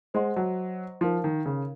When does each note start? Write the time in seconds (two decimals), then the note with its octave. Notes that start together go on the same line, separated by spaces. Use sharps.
0.14 G#3 C5 D#5 F#5 C6
0.36 F#3
1.01 F3 D#4 A#4 F5 C6
1.24 D#3
1.46 C#3